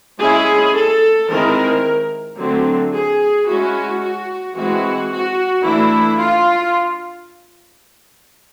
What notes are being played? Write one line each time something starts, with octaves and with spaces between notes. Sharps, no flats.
G#3 C#4 E4 G#4
A4
D#3 G#3 C4 E4 A#4
D3 F#3 A3 C4
G#4
G#3 C#4 E4 F#4
F#4
E3 G#3 C4 E4 F#4
F#4
E3 A3 D4 E4
F4